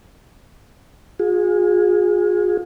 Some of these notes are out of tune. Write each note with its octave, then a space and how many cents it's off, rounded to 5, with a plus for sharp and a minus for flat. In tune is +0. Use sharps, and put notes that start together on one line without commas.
F4 +45 G#4 -10